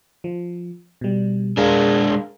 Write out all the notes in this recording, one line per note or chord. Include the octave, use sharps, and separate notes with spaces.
F3
B2 G3
G#3 D4 G#4 A#4 F5